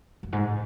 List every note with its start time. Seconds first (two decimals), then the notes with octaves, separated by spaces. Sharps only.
0.23 F#2
0.33 G#2